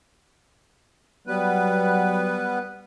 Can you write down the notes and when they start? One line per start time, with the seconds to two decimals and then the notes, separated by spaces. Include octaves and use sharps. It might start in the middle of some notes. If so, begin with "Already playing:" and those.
1.27 F#3 G3 B3 B4